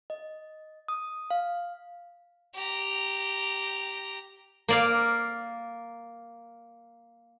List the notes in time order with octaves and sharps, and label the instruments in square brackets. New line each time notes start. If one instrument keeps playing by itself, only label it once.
[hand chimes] D#5
D#6
F5
[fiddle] G4 A#5
[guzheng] A#3 D5 F5